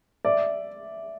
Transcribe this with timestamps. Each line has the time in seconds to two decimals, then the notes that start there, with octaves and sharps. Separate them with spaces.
0.25 D5 E5